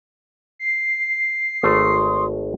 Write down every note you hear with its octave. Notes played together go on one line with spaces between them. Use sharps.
C7
G#1 A3 C#5 C6 D#6